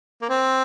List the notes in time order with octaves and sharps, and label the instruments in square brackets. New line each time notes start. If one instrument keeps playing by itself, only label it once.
[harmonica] A#3
C4